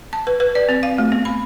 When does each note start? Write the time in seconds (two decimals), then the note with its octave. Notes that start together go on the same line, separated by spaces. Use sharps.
0.13 A5
0.27 B4
0.40 B4
0.55 D5
0.69 C4
0.83 F5
0.98 A3
1.12 B3
1.25 B5